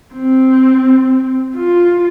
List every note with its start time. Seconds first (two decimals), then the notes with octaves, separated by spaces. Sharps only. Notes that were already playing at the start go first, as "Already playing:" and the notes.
0.14 C4
1.56 F4